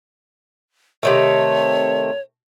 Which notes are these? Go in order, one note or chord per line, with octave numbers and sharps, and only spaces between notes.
C3 D#3 A3 C#5